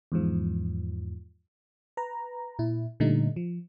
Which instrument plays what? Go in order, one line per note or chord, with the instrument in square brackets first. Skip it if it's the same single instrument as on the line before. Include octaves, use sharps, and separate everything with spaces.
[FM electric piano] E2 G#2 F3
B4 A#5
A#2 E4
A#2 D3 G3 A3 D#4
F3